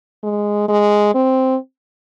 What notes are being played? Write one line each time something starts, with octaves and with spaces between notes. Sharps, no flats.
G#3
G#3
C4